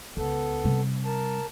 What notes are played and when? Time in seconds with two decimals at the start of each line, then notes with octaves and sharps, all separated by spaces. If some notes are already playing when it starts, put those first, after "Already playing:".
0.17 C#2 B3 A4
0.64 C3 G3
1.05 A#4 A5